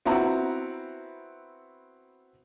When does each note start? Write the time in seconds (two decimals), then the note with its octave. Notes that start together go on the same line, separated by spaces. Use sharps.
0.06 B3 C4 E4 F#4 F#5 A#5